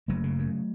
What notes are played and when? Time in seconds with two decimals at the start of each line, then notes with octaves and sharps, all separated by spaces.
0.08 F#1 F#3 A3
0.24 C#3
0.39 F#2